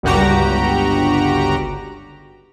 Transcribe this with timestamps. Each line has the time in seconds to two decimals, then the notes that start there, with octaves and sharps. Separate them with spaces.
0.03 G1 C#2 G2 F#4 G4 A#5